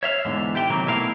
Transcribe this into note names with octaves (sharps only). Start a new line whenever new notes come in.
C#5 E5 F5
E2 G#2 D3
G4 E5 G5
C3 D#3 E3 F#3 A#3 C4
B2 A3 E4 A#4 E5 F5